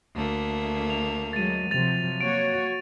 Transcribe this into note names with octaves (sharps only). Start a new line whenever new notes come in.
D2 A3 A#3
F7
F#3 G#3 A6 D#7
C3 F3 F#3 A6 F7
A#3 F#4 C#5 D7